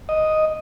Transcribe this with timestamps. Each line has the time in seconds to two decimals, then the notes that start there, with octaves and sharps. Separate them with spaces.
0.09 D#5